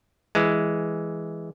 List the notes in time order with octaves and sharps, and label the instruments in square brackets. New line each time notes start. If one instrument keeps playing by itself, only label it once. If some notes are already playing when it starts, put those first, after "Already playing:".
[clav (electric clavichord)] E3 G#3